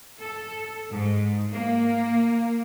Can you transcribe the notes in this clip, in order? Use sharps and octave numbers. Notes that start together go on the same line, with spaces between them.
A4
G#2
A#3